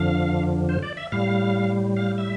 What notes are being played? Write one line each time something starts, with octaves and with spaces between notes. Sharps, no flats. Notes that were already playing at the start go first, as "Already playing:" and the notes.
Already playing: F2 D3 F3 F5
C5
D5
E5
A2 G3 F5
F5
E5